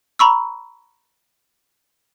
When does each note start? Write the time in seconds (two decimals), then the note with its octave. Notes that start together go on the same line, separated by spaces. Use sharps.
0.19 A#5 B5 C#6 E6